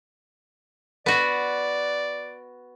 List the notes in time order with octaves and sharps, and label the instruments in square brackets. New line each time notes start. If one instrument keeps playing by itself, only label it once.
[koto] B3 F#4 [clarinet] D5